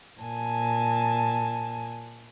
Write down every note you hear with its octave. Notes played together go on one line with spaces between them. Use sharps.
A#2 G#5 A5